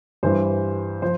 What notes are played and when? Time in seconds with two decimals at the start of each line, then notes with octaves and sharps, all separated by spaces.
0.23 G2 E3 C5
1.02 F3 C5